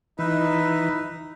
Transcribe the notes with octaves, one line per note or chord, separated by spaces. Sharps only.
E3 D#4 B4 E5